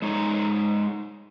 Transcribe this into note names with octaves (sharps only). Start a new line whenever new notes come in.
G#3 D#4 C#5 A#5